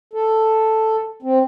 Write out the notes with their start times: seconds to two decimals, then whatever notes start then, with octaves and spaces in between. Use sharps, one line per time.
0.14 A4
1.22 C4